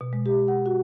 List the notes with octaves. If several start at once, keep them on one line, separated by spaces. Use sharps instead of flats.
B2
G#3
G4
F#5
F#4